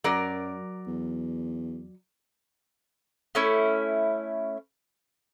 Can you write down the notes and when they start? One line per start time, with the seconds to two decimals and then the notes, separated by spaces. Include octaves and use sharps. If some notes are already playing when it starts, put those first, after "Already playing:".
0.04 F#2 F#3 A#4 D5
0.87 E2
3.35 A3 C#4 E4